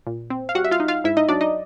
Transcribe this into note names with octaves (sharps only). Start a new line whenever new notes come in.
A#2
C4
F5
G3 F#4 F#5
E5
F4 F5
D#4
F4 F5
G#2 E4 E5
D#4 D#5
F#3 D4 D5
D#4 D#5